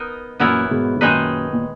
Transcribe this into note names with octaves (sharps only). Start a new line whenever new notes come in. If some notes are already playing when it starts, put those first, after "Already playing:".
Already playing: B3 D#4 A#4 D#5
F#2 A#2 E3 B3 E4 A#4 C#5
G#2 B2
G#2
F#2 A#2 D#3 G#3 D#4 G#4 B4
A#2